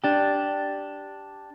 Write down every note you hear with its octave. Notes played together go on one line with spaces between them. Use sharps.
D4 G4